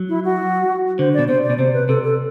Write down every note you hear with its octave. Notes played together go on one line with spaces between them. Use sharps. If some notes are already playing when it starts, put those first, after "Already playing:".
Already playing: F#3
E4
F#4
D3 C5
D5
B2
C3 C5
D5
B2
C3 C5
B4
C3 A4
A4